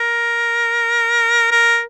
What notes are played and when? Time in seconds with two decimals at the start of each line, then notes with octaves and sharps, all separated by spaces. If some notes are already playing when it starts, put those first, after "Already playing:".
Already playing: A#4
1.51 A#4